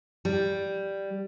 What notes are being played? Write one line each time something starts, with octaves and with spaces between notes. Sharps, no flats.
G3